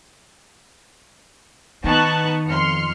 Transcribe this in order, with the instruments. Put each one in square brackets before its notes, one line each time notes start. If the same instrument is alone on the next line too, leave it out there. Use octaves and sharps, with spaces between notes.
[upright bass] D#3 [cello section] B3 D#4 [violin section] A5 C#6 F#6
[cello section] F2 [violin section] C6 F6 C#7